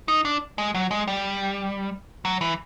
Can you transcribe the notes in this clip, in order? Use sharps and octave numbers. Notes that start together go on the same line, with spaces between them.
D#4
D4
G#3
F#3
G#3
G3
F#3
E3